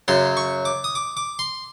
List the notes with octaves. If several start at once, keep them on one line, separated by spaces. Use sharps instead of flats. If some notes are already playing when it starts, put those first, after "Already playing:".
F#2 C#3 F#3 C6
C#6
D6
D#6
D6
D6
C6